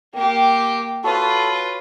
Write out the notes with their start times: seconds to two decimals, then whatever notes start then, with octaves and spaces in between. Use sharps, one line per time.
0.13 A#3 G4 G5
1.04 F4 F#4 A4 B4 C#5 D#6